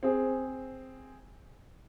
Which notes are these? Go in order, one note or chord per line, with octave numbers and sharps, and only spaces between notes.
C4 G#4